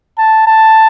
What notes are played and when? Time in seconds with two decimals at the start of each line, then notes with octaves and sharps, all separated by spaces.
0.18 A5
0.47 A5